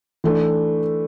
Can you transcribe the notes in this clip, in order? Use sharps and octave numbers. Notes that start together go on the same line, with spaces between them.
E3 A3 D4